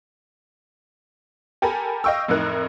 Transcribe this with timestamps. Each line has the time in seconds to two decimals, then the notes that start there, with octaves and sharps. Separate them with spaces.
1.62 G4 A4 A#4 G#5 A#5 B5
2.04 D#5 F5 G5 C#6 E6
2.28 F2 A2 A3 D#4 A#4 F#6